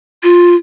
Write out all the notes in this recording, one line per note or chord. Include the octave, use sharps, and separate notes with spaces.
F4